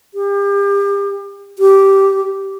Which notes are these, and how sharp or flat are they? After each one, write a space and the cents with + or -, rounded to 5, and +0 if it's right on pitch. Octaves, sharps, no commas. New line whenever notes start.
G4 +35
G4 -10